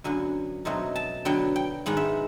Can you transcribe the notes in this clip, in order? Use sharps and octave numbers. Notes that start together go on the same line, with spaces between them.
F#2 D3 F#3 B3 G#5
B2 F#3 A3 C4 D#4
A5
D3 F#3 B3 G5
G5
G#2 D#3 G#3 B3 F#5
E5